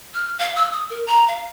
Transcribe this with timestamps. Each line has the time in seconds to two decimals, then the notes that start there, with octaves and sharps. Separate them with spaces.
0.14 F6
0.39 F5
0.56 E6
0.73 D#6
0.90 A#4
1.07 A#5
1.28 F5